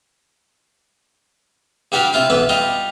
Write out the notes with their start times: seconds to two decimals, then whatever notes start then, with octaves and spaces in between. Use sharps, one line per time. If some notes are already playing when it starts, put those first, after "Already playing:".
1.92 G2 G3 F#4 G4 D5 F5
2.13 C3 E4 F4 F5
2.30 B1 E3 B3 B4
2.49 G3 F4 D#5